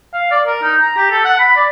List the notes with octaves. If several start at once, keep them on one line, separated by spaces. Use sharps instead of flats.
F5
D5
A#4
D#4
A#5
G4
A4
F#5
B5
D5